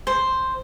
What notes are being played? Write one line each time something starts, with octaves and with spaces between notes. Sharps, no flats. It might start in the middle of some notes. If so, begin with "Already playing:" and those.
C5